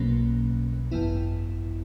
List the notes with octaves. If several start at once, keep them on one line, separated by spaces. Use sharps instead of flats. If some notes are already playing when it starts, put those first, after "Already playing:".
Already playing: B1 B2 F#3 A#3 C#4
G#1 F#2 E3 B3 E4